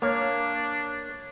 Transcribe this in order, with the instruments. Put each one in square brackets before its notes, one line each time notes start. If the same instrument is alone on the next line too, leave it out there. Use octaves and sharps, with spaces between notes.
[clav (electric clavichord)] A#3 [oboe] D4 [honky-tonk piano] C#5 D6